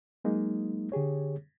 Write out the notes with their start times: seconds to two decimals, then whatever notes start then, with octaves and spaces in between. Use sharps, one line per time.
0.24 F#3 G#3 A#3 D#4
0.92 D3 G4 G#4 C#5